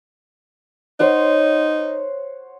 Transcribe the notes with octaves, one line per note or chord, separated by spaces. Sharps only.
D#4 C5 C#5 F#5